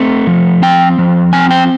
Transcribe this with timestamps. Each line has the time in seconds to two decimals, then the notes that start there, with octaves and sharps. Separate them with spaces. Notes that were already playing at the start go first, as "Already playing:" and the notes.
Already playing: A3 C4
0.27 F3
0.62 C4 G5
0.98 F3
1.33 C4 G#5
1.51 G5